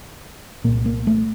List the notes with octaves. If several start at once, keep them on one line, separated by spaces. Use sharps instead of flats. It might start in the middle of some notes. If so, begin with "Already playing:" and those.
C2 A#2 A#3
A#3
A3